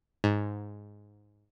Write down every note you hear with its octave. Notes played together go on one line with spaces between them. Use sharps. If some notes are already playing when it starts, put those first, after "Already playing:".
G#2